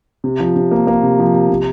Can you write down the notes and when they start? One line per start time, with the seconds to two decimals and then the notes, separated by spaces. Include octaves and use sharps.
0.24 C3
0.40 F3
0.56 C3
0.71 A#3
0.87 A#3
1.03 C3
1.19 F3
1.34 C3
1.50 C3